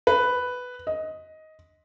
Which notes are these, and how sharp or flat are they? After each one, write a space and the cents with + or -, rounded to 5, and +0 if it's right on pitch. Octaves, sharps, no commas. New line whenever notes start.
B4 +5
D#5 +10